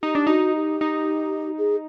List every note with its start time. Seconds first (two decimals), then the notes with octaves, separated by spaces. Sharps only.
0.03 D#4 G4
0.15 D4
0.27 D#4 F#4
0.55 G4
0.81 D#4
1.58 G#4